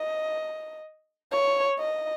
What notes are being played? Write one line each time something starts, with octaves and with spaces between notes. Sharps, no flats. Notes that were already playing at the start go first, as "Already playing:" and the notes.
Already playing: D#5
C#5
D#5